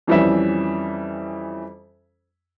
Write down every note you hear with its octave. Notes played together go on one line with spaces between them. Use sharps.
F2 E3 G3 C#4 E5